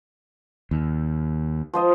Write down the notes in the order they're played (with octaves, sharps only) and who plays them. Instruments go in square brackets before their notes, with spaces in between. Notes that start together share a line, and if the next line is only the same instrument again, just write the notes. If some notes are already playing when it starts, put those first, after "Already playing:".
[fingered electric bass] D#2
[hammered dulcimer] F3 C5 D#5